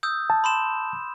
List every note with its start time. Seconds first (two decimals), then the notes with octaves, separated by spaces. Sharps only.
0.03 D#6 E6 G6
0.30 A5
0.44 B5 C6 E7